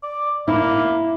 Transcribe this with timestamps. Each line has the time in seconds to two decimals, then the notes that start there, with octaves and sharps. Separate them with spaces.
0.03 D5
0.48 A#3 E4